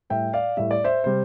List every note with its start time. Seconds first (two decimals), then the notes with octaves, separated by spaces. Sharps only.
0.10 A2 G3 E5 G5
0.33 D5 F5
0.57 A2 G3 E5
0.71 D5
0.84 C5 E5
1.04 C3 G3 C5